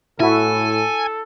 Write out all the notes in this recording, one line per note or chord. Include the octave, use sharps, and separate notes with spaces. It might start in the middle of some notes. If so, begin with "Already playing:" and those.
A2 E4 F#4 A4 G#5